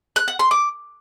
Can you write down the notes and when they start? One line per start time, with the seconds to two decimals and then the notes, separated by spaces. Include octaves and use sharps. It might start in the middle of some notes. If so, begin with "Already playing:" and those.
0.16 F#6
0.28 F#5
0.39 C6
0.51 D6